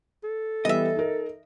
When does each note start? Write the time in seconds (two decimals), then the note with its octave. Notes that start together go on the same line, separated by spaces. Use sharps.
0.24 A4
0.65 E3 G3 B3 D#5 E5
0.95 D#4 A#4